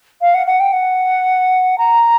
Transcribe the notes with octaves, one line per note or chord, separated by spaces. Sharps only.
F5
F#5
F#5
G5
F#5
A#5